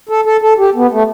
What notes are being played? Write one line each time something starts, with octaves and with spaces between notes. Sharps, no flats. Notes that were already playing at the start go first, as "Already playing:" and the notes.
A4
A4
A4
G4
B3
A3